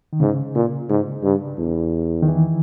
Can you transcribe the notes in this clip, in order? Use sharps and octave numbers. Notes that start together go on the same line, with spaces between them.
D#3
G#2 C#3
A#2
G#2
G2
E2
D#3
E3